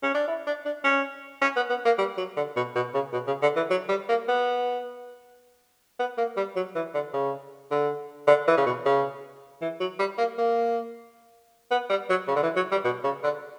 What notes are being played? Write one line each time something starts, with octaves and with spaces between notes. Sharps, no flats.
C#4
D4
E4
D4
D4
C#4
C#4
B3
B3
A#3
G3
F#3
D3
B2
B2
C#3
B2
C#3
D3
E3
F#3
G3
A#3
B3
B3
A#3
G3
F#3
E3
D3
C#3
D3
D3
E3
C#3
B2
C#3
E3
F#3
G3
A#3
A#3
B3
G3
F#3
C#3
D3
E3
F#3
G3
B2
C#3
D3